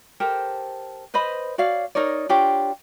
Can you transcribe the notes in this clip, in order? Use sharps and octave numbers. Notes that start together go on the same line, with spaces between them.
G4 A4 A#4 C5
B4 C5 D#5 B5
F#4 C#5 D5 F5
D#4 A#4 C#5 D5
D4 F4 G4 C#5